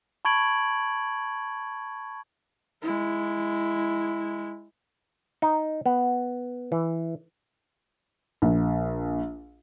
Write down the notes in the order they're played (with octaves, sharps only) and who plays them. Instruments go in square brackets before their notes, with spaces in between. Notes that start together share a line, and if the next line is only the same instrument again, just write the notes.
[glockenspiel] A5 B5 C#6 G#6 D7 F#7
[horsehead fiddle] G#3 E4
[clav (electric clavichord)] D#4
B3
E3
[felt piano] A#1